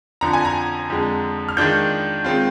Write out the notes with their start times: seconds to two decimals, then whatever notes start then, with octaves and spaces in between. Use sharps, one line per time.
0.21 F2 D3 F3 A#5
0.33 G#5
0.45 A#5
0.90 F2 D3 G#3
1.49 F6
1.57 D#3 G#3 D4 F4 G6
2.24 D#3 G#3 C4 F4